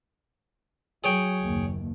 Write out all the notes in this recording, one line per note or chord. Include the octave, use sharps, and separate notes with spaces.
F#3 G#4 C#5 G5
F#1 D#2